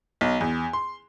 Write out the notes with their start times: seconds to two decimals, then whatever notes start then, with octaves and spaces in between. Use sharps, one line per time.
0.21 B1
0.41 E2
0.73 C6